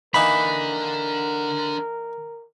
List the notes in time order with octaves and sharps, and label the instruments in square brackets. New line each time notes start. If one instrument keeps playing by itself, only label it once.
[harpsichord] E3 A#3 D#4 [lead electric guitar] D4 A4 [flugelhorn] A#4 [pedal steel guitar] B5